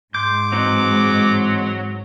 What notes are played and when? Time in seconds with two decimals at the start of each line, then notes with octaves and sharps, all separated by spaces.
0.15 G#2 C6 D6 G6
0.52 E3 F#3 C4 D#4